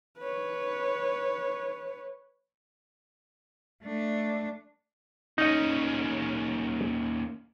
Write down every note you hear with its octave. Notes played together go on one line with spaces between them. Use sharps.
B4 C#5
A3 D4
D#2 C#4 D#4 D#5